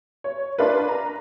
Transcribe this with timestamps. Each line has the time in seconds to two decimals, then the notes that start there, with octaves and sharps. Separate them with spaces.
0.24 C#5
0.58 D4 F4 A#4 B4
0.89 A#5